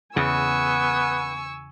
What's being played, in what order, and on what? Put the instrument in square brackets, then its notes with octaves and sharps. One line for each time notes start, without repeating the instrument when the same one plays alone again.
[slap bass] E2 C#3 [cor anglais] B3 [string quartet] G#5 C#6 E6